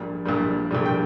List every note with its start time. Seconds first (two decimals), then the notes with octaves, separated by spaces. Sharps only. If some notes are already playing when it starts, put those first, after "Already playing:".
Already playing: A#1 A#2 G3
0.25 A#1 A#2 G3
0.71 A#1 A#2 G3
0.86 G5